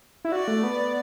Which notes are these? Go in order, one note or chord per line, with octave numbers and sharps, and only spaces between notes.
E4
F#4 D5
A3
B3